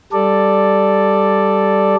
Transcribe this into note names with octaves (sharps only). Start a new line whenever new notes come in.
G3 A4 D5